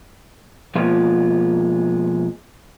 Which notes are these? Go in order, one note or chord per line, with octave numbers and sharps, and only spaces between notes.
B2 F3 G#3 A#3 F4